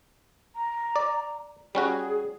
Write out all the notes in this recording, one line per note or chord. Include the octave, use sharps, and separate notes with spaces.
A#5
D5
G3 C#4 F#4 G#4